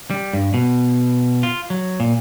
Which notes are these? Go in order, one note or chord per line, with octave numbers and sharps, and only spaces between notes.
G3
G2
B2
F4
F#3
A#2